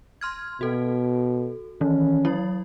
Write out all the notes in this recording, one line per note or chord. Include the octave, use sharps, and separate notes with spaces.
C6 F6 G#6
B2 F#4 A4
D#3 E3 C#4
F#3 E4 C#5